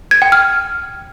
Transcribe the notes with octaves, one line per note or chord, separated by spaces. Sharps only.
G#6
G5
F6